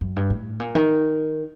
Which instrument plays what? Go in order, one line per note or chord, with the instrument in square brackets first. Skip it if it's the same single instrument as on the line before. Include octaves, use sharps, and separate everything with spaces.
[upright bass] F#2
G2
A2
A#2
D#3